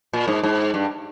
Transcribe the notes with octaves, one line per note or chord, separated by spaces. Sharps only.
A#2
G#2
G#2
G2